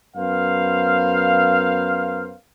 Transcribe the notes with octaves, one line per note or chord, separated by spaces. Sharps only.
F#2 B3 A#4 C5 F5